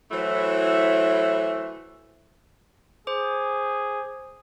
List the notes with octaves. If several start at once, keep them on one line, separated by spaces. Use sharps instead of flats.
E3 F#3 A3 E4 C5
G#4 C5 D6